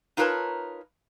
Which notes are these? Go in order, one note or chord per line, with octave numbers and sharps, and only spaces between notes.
D#4 F4 A#4 B4 C#5 A5